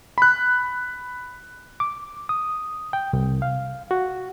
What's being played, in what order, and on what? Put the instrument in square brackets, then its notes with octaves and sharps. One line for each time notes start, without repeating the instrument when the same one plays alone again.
[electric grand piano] B5 F#6
[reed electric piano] D6
D#6
G5
C2
F5
F#4